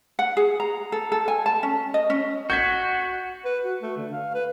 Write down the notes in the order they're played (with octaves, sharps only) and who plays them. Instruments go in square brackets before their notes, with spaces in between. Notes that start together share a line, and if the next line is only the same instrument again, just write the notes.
[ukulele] F#5
G#4
A#5
A4
A4
G#5
A5
C#4
D#5
C#4
[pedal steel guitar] F#4 [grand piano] G6 G#6 B6
[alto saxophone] B4
F#4
A3
D3
F5
B4